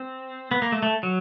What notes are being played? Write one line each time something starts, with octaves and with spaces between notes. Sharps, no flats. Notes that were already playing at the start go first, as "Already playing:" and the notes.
Already playing: C4
B3
A#3
A3
A3
F#3